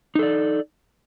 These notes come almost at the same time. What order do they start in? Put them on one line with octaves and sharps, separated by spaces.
D#4 A4 D5